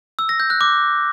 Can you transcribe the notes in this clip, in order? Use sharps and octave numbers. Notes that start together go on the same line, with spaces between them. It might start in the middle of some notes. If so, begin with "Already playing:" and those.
E6
A#6
G6
F#6
D6